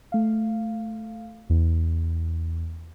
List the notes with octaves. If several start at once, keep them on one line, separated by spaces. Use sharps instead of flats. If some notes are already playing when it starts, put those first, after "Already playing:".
A3 F5
E2